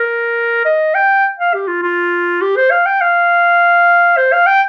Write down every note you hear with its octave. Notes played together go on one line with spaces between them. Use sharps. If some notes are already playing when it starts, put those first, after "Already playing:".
Already playing: A#4
D#5
G5
F5
G4
F4
F4
G4
C5
F5
G5
F5
C5
F5
G5